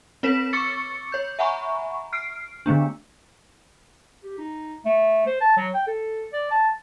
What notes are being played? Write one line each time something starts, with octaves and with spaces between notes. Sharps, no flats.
C4 B4 C#5 B6 E7
C#6 D6 E6 A6 C#7
C#5 G6
E5 F#5 G#5 A#5 B5 C#6
F6 C7 D7
D3 A3 B3 D4
G4
D#4
A3
C5
A5
F#3
G5
A4
D5
A5